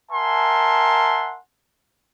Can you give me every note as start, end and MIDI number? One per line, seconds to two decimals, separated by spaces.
0.12 1.38 70
0.12 1.38 76
0.12 1.38 78
0.12 1.38 80
0.12 1.38 81
0.12 1.38 84